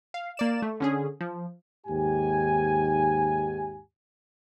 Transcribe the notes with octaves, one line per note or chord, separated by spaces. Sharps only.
F5
A#3 D5 E7
A3
D3 C#4 G#4
F3
D#2 G#2 G4 G#5